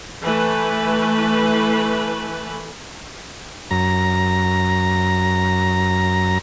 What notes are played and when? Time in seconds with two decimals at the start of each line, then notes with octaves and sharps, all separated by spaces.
0.23 E3 A3 B4
3.71 F#2 A#5